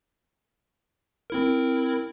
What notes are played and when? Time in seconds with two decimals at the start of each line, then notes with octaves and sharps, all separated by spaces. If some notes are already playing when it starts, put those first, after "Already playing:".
1.30 C4 E4 A#4